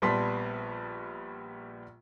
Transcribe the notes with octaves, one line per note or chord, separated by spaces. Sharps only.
A#1 G3 B3 A5 C6 B6